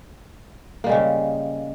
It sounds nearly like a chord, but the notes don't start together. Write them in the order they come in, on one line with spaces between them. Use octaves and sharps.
A#3 G3 G#3 C#3